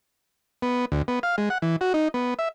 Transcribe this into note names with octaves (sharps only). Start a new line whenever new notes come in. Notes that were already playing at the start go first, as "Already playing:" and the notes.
B3
D2
B3
F5
G#3
F#5
E3
F#4
D#4
B3
E5